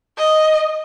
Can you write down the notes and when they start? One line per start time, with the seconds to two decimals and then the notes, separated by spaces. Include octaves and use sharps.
0.18 D#5